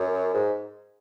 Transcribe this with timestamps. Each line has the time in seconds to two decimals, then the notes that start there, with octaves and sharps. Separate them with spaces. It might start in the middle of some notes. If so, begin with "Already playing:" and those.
Already playing: F#2
0.34 G#2